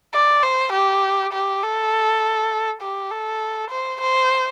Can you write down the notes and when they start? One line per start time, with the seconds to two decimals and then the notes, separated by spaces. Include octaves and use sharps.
0.14 D5
0.43 C5
0.73 G4
1.33 G4
1.63 A4
2.82 G4
3.11 A4
3.71 C5
4.01 C5